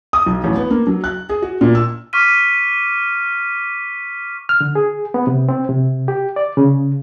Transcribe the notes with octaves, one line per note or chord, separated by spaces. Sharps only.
D#6
B1
A1
B3
A#3
F#3
F#6
G#4
F#4
A#2
E6
C#6 D6 F6 B6 D#7
F6
D3
G#4
B3
C3
C4
C3
G4
D5
C#3